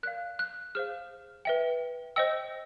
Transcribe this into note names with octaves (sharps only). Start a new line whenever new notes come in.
A#4 D5 F5 F#6
F#6
G#4 C5 F5 F6
B4 E5 G5
C5 D#5 G5 E6